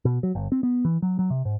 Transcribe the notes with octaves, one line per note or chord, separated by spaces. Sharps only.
B2
F#3
G1
C4
B3
E3
F#3
F#3
C3
G#2